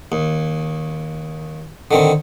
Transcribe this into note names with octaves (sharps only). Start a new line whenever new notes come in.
D#2
D3 D#3 C4